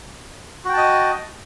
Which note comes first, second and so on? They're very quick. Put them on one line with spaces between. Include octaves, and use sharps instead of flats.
F#4 G5 A5 D#5